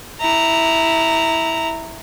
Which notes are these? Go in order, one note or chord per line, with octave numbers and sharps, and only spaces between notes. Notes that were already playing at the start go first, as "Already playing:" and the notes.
E4 A#5